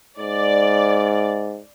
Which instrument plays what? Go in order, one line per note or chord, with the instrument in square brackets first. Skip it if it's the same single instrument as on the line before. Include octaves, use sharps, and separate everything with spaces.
[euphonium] G#2 [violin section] D5